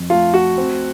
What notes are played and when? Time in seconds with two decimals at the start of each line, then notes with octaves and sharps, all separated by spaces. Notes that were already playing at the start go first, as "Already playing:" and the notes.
Already playing: F2
0.10 A3 F4
0.34 F#4
0.57 C4